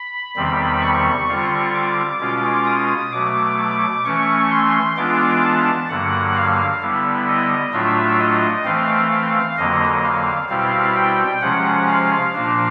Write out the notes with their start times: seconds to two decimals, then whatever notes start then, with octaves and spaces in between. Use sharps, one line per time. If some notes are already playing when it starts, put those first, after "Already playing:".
Already playing: B5
0.36 E2 C3 D#3 G3 C4
0.82 C#6
1.29 D3 G3 C4 F4
1.74 D6
2.20 B2 G#3 C#4 F4
2.67 D#6
3.12 B2 F#3 A3 D6
3.59 D6
4.05 E3 A3 C#4 C#6
4.51 C6
4.97 E3 G#3 B3 D4 F4 D6
5.42 A5
5.89 G2 D3 F#3 A#3 F#5
6.35 F5
6.81 D3 G3 B3 E4
7.28 D#5
7.73 A2 F#3 A3 D4 F4 E5
8.19 D#5
8.65 E3 A3 C4 F5
9.11 F5
9.57 F2 D3 F#3 A#3 D#5
10.03 F5
10.49 B2 G3 C4 E4 F5
10.96 G5
11.41 C3 F3 G#3 C#4 F#5
11.88 F5
12.33 A#2 F3 A#3 D4